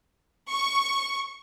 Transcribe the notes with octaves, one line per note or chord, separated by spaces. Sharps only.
C#6